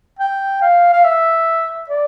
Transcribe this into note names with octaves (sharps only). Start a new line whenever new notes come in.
G5
F5
F5
E5
D5